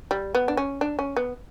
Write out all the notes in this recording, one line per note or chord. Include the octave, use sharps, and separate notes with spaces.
G3
B3
D4
C#4
D4
C#4
B3